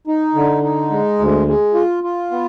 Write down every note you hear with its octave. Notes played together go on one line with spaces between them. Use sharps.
D#4
D3
D#4
G#3
D2
G#3
F4
F4
B3